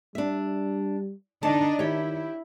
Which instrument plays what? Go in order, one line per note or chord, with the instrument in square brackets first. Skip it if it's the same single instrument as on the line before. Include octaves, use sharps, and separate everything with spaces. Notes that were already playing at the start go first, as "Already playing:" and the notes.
[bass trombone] G3 [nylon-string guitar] D4 E5
[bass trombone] D3 [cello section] D4 D#4 D#5 [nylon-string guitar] A5
[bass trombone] D#3 [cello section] E4 [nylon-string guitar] G4 C#5